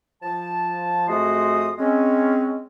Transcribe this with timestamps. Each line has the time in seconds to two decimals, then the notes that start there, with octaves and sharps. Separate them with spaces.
0.22 F3 A5
1.08 F2 G#3 A3 F#4 C6 D#6
1.78 G#3 C4 C#4